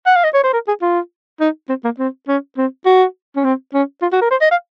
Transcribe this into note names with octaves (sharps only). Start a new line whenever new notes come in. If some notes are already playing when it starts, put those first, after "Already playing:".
F#5
F5
D#5
C#5
C5
A#4
G#4
F4
D#4
C4
A#3
C4
C#4
C4
F#4
C#4
C4
C#4
F4
F#4
A#4
C5
D#5
F5